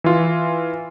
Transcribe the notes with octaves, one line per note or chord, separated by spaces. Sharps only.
E3 F4